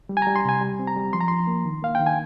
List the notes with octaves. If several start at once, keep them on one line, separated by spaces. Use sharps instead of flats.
G3
G#5
G3 A#5
C6
C3 G#5
G3
C4
A#5
G3
F3 C6
A#5
F3 C6
A#3
D#3
A#3 F5
D#3 G5
G#5